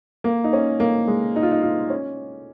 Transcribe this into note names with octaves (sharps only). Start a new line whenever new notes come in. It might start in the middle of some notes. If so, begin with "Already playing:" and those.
A#3
D#4
C#4
A#3
G#3
D#4
F4
D#4
F4
C#4